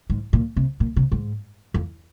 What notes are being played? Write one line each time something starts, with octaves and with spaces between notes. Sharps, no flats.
G#2
A#2
C3
A#2
C3
G#2
F2